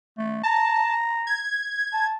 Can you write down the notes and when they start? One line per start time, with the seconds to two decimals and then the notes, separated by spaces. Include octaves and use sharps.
0.18 A3
0.43 A5 A#5
1.27 G#6
1.93 A5